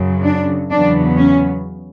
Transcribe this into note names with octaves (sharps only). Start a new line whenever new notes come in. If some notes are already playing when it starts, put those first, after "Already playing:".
Already playing: F#2 C#3 F#3
D4
E2 C#3 F#3 B3 D4
C#4